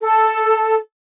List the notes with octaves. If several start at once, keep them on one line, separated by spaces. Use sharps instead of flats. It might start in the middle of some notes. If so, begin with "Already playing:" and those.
A4